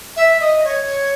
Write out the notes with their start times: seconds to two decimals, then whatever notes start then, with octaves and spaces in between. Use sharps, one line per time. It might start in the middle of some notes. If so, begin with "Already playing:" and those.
0.16 E5
0.40 D#5
0.64 C#5